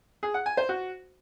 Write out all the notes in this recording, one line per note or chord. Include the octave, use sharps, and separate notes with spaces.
G#4
F#5
G#5
C5
F#4